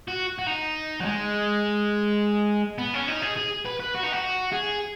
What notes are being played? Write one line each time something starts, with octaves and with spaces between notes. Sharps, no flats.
F#4
F#4
D#4
F#3
G#3
B3
C#4
D#4
G#4
G#4
B4
B4
F#4
D#4
F#4
G#4